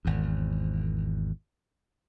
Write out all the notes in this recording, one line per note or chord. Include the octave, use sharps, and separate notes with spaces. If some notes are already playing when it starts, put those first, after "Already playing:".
G#1 E2